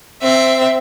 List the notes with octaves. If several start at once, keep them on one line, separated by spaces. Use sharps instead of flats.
C4 E5